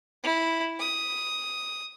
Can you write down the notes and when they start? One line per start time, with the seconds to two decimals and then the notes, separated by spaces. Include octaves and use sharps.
0.23 E4
0.79 D#6